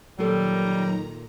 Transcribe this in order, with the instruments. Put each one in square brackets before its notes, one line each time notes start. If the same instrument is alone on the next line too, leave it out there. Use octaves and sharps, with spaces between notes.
[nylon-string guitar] A#2 A4 [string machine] D#3 A#5 [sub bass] F#3 [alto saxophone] G3